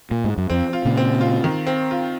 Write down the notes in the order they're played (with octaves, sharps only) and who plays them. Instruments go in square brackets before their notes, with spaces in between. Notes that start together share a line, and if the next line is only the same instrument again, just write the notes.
[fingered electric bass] A#2
G#2
F#2
[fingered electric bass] F2 [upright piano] C4
[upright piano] F4
[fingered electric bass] A#2 C#3
[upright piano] C4
F4
D#3
C4
F4